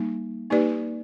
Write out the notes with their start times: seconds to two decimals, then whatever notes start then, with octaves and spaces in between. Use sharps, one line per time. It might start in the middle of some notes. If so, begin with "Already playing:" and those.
Already playing: G3 A#3 D#4
0.50 A#3 D#4 G4 B4 D5